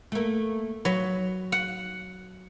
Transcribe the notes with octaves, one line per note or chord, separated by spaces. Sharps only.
A3 A#3
F#3 B4
F#5